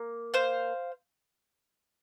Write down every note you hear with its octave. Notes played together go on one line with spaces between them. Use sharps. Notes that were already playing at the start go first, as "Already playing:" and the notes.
Already playing: A#3
C5 F5